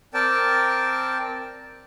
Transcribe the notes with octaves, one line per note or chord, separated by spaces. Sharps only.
C4 A#4 D5 G5 A5